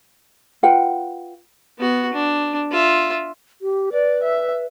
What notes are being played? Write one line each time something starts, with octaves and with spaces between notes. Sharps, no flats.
F4 B4 F#5 G5
B3 F#4
D4
F4 E5
G4
B4 D5
E5